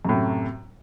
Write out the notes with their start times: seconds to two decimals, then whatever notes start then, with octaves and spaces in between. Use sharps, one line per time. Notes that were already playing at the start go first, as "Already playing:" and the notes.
0.05 F#2
0.09 A2
0.13 C3